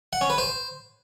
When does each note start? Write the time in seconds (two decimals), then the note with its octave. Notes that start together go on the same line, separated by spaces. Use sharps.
0.13 F#5
0.21 C#4
0.30 B4
0.38 C5